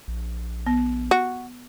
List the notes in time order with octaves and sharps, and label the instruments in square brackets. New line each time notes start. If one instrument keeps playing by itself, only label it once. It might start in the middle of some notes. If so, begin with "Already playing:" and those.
[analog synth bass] A#1
[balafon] B3
[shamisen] F#4